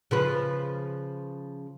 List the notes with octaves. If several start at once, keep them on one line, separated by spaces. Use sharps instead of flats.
C#3 F3 B4